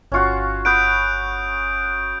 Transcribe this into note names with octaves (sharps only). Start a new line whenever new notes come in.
G1 C#4 F4 F#4 C#6
B4 F#5 D#6 G6 D7